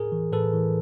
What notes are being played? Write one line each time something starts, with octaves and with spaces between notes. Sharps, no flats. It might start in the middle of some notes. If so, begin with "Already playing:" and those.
Already playing: A2 G#4 A#4
E3
A2 A4 B4
E3